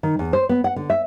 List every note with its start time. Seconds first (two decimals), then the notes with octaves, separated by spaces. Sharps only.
0.03 D#3
0.19 E2
0.33 C5
0.49 B3
0.64 F#5
0.76 D3
0.90 E5